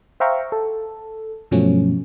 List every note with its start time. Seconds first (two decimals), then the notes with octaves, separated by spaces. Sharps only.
0.20 C5 E5 F5 G5 A#5 C#6
0.52 A4
1.51 G2 B2 F3 F#3 A3 C#4